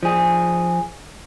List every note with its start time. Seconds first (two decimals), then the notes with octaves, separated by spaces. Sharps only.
0.03 F3 G#4